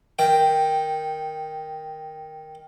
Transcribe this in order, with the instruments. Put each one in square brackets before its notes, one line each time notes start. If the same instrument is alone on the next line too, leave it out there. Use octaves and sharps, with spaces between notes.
[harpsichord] D#3 G5